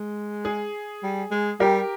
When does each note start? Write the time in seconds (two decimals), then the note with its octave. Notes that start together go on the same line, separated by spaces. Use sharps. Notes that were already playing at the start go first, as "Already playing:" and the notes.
Already playing: G#3
0.45 G#4
1.03 G3
1.31 G#3
1.60 G3 G4 A#4